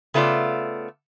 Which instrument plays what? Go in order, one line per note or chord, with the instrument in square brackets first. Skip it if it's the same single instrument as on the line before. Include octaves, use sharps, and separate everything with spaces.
[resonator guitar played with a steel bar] C#3 A3 B3 F4 D5